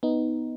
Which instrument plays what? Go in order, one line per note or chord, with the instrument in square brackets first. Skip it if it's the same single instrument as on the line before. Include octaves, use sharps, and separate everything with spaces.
[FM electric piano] B3 D#4